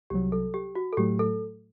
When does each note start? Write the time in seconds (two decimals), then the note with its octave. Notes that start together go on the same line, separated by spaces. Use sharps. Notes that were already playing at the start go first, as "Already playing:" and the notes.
0.10 C2 C3 F#3 G4
0.32 A4
0.54 G4
0.75 F#4
0.93 A4
0.97 A2 F#3 A3 G4
1.19 A4